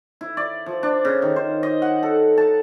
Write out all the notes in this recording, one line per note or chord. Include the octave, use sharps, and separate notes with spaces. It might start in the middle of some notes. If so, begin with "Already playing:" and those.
E4
D5
F3
D4
C#3
D#3
C5
D#5
F#5
A4
A5